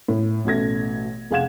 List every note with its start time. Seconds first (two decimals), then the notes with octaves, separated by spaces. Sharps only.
0.08 A2
0.45 A1 B2 A3 G#6 A#6
1.31 F1 G#4 F5 F#5 G#6 E7